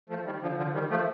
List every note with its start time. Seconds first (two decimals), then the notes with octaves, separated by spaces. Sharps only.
0.10 F3 A3
0.26 D#3 G3
0.42 D3 F3
0.57 D3 F3
0.74 D#3 G3
0.90 F3 A3